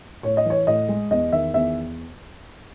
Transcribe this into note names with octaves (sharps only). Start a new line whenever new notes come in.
A2 C#5
D#5
E3 C#5
A2 D#5
G#3
E2 D#5
D#3 E5
E2 E5